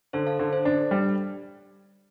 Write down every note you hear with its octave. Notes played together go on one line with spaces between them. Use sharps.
D3 A4 C5
F5 A5
D3
A4 C5
D4
G3